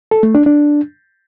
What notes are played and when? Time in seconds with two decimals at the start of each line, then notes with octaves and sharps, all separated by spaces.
0.11 A4
0.23 A3
0.35 D4
0.46 D4